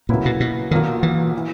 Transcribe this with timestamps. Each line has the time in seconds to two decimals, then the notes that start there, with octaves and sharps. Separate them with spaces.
0.09 A#2 C#3 F#3 A#3 E4 B4
0.25 B2
0.40 B2
0.71 B1 A#2 D#3 F#3 A#3
1.03 E3
1.37 E3